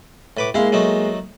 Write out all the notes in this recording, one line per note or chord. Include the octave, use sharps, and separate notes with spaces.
A2 B4 D6
G#3 A#3 E4 F5 C6
F#3 A3 D#4